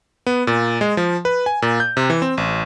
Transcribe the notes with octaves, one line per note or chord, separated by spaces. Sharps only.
B3
A#2
G#3
F3
B4
G#5
A#2
G6
C3
E3
C4
A1